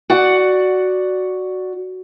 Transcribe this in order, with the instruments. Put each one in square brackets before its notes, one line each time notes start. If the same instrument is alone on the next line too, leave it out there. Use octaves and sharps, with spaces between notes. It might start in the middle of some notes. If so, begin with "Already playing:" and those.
[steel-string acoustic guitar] F#4 D5 F#5